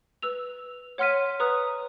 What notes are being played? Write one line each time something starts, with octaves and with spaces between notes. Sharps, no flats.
B4 E6 F7
C#5 F#5 C6 F6 B6 D#7
B4 A#5 D#6 F#6